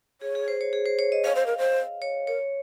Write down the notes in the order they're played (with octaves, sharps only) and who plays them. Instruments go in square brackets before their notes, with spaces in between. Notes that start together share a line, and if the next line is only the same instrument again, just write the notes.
[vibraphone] G#4 [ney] C#5
[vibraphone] G#4
C5
C#5
G#4
C5
C#5
D#5
[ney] C#5 [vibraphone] F5
[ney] C5
A#4
C5
[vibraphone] C#5
[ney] A#4 [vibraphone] C#5